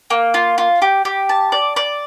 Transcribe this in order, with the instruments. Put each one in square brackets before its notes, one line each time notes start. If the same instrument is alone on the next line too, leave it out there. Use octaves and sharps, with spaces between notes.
[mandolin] A#3
F4
F4
G4
G4
A5
D5
D5